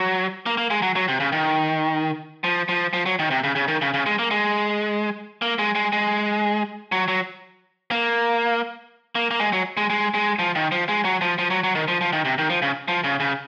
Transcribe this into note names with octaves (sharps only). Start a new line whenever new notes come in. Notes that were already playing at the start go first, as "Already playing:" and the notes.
Already playing: F#3
A#3
A#3
G#3
F#3
F#3
C3
C#3
D#3
F3
F3
F3
F#3
D#3
C3
C#3
C#3
D#3
C#3
C#3
G#3
A#3
G#3
A#3
G#3
G#3
G#3
F#3
F#3
A#3
A#3
A#3
G#3
F#3
G#3
G#3
G#3
F3
D#3
F3
G#3
F#3
F3
F3
F#3
F#3
D#3
F3
F3
D#3
C3
D#3
F3
C#3
F3
C#3
C#3